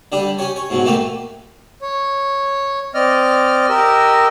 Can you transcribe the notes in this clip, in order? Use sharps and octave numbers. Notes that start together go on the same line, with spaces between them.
D3 G3 D4 G4
C#4 G4 C#5
C#5
G#2 B2 F#3
E3 A3 A#3 G4 B4
C#5
C4 D5 D#5 F6
G4 A#4 D#5 E6